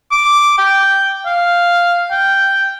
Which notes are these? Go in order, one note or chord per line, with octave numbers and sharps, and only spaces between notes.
D6
G5
F5
G5